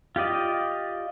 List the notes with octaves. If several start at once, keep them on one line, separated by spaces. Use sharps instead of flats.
F4 G4 D5 D#5